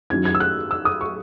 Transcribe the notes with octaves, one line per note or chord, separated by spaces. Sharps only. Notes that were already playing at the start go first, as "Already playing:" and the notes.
F#2 D#3 F#3 C#4 E4 G#6
G#6
E6
F#6
E6
D#6
C#6